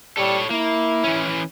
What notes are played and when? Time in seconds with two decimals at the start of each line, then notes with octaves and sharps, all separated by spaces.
0.17 G3 A4 C#5
0.51 A#3 E4
1.04 E3 C#4